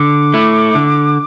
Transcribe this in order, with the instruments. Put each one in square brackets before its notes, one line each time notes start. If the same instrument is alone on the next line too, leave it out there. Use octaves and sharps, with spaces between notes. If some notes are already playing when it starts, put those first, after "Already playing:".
Already playing: [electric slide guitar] D3 [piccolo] D6
[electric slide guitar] A3 E4
D3